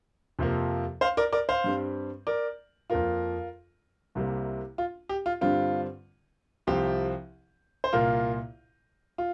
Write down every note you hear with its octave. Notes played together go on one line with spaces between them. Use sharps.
F2 C3 F3 A#3
C5 F5
A#4 D5
A#4 D5
C5 F5
G2 G3 C4
A#4 D5
F2 F3 A#3 F4 A#4
C2 C3 G3 A#3
F4
G4
F4
G2 D3 G3 C4 F4
C2 C3 F3 C4 G4
C5
C2 A#2 A#3 F4 A#4
F4